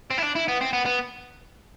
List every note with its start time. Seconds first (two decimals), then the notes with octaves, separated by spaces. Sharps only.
0.11 C4
0.18 E4
0.23 D4
0.36 E4
0.48 B3
0.61 C4
0.73 B3
0.86 B3